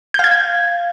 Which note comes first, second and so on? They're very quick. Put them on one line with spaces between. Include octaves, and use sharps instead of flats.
G6 F5 G#6